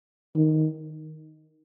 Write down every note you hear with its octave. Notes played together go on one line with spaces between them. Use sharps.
D#3